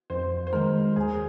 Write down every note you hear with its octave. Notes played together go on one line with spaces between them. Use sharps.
F2 C5
C5
D#3 G#3 A#4
D#2 G#4